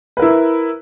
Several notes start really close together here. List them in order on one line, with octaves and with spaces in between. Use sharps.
B4 A#4 E4